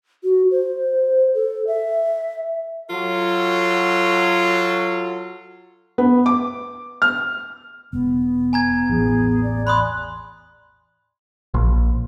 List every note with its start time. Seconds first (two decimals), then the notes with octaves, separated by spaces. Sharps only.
0.24 F#4
0.51 C5
1.35 A4
1.67 E5
2.90 F#3 F4 F#4 A4
5.98 B3
6.26 D6
7.02 F6
7.93 E1 B3
8.53 G#5 A#5 G#6
8.89 A1 E2 G#4
9.43 D5
9.67 D5 B5 C6 D#6 F#6
11.54 A#1